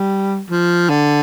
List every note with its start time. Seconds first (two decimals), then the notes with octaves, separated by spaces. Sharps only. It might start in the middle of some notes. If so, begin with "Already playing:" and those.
Already playing: G3
0.50 F3
0.90 D3